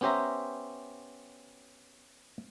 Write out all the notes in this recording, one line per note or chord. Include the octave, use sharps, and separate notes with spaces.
B3 C#4 G4 C5 E5 A#5